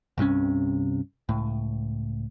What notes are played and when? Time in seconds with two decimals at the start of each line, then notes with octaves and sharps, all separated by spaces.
0.18 C2 G2 C3 C#4
1.29 C#2 A2